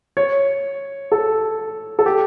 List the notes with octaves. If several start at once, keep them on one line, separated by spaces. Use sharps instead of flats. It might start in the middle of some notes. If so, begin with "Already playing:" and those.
C#5
A4
A4
G4